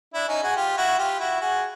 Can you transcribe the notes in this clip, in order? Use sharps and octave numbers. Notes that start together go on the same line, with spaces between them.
D4 E4
C#4 D#4
F#4 G#4
F4 G4
E4 F#4
F4 G4
E4 F#4
F#4 G#4